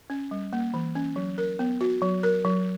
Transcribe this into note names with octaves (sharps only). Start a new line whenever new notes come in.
C#4
G3
A#3
E3
C#4
F#3
A#4
B3
F#4
F#3
A#4
F#3